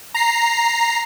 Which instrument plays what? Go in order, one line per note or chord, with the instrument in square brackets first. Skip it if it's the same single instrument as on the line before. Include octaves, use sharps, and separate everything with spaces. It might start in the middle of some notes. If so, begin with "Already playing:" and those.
[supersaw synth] A#5 C7